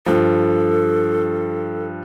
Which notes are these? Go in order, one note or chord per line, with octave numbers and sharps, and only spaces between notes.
G2 F3 A4